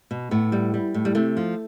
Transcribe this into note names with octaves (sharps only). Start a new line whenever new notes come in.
B2
A2 B3
G3
G3
A2
G3
C3 A3
F3